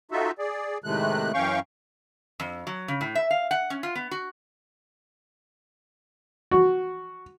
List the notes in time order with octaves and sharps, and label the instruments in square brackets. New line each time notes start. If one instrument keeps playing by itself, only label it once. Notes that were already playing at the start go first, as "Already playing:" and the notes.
[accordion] D#4 F4 F#4 A4 E5
G#4 D5
A2 C3 D#3 G#3 A3 F#6
F#2 E3 C#4 F5 G5 C#6
[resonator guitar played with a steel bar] F2
F#3
C#3
A2
E5
F5
F#5
C#4
F4
B3
F#4
[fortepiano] F#4